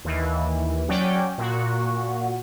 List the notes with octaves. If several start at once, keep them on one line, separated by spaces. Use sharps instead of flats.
D#2 E3
F#3 C#4 D5 G5
A#2 F#4